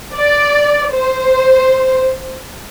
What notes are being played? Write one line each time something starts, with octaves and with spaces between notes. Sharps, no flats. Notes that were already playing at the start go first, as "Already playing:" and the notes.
D5
C5